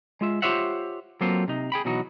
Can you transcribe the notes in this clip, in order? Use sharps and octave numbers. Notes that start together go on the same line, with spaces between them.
G#3 F4 E5
F4 G4 C5 C#5 E5 F#5
F#3 A#3 C4 F4 A4 C5
C3 D#4
G#4 G5 B5
B2 E3 F#3 D#4 F#4